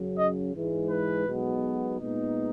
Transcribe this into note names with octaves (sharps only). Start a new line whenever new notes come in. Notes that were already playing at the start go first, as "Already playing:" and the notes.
Already playing: F#2 C#3 F#3
D#5
G#2 E3 G#3
B4
B1 B2 G#3 B3
A#2 G#3 B3 D#4